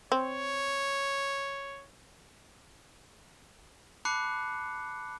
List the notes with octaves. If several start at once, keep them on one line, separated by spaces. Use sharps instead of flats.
C4 C#5
A5 B5 D6 F#6 C7 C#7